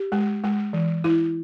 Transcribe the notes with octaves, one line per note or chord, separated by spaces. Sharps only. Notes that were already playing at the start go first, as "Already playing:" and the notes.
Already playing: G4
G#3
G#3
E3
E4